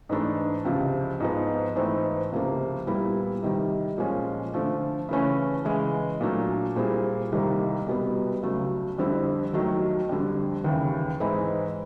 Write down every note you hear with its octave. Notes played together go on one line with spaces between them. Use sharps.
G#2 E3 A3 D4
C#2 C3 F3
G#2 F3 G#3 B3
G#2 E3 A3 C4
C#2 C3 F3 A#3
A#2 G3 B3 E4
C3 D#3 G3
A#2 F3 G#3 C#4
D3 F3 A3
C#3 E3 A3 C#4
C#3 E3 G#3
A#2 F#3 A3 D4
A#2 G3 C4 E4 G#4
C2 C3 D#3 G3 A#3
C2 B2 G3 B3
C#2 C#3 F#3 A3
F2 D3 G3 C4 E4
D#2 D#3 F#3 A3
F2 D3 G3
D#2 C#3 E3
G#2 E3 G#3 C4 E4